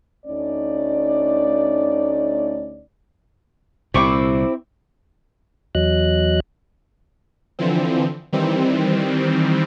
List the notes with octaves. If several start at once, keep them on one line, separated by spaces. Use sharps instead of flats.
D2 A3 C#4 D#4 D5
C2 A#2 C4 E4 G4 C#6 D6
E2 F#3 D#5 F#6
D3 E3 F3 C4
D#3 E3 G3 C4